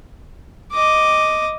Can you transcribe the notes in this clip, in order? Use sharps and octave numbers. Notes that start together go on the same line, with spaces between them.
D#5 D6